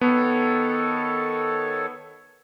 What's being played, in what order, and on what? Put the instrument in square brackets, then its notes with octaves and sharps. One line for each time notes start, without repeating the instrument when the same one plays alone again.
[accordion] D#3 A4 C#5 [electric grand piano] B3